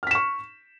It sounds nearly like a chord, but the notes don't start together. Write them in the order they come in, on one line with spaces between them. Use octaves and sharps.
F6 B6 E7 C#6